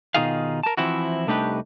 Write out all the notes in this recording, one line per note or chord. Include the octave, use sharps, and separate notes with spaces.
B2 D#3 D#4 F4 G#4 F5
A#4 A5
E3 F3 C4 E4 F#4
C2 A3 D4 D#4 G4 B4